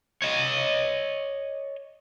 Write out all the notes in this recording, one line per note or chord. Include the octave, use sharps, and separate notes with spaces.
C#5 D#5